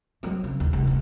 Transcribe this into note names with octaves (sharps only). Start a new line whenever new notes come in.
F#3 C4
C#3
D#2
F1 G#3
A2